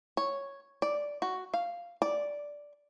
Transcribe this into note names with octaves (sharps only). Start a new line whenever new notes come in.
C#5
D5
F#4
F5
D5